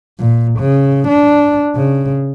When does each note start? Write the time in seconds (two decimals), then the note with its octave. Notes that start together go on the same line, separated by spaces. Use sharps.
0.19 A#2
0.59 C#3
1.08 D4
1.76 C#3